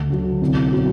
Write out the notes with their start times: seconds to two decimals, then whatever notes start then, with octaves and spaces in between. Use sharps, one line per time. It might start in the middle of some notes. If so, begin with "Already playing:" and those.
Already playing: D2
0.10 D3 F#3
0.42 C2
0.73 B2 F#3